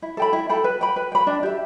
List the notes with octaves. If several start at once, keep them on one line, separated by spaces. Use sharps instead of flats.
E4
A4 G5 B5
E4
A4 G5 B5
B4
G5 B5
B4
G5 B5
D4
G4 E5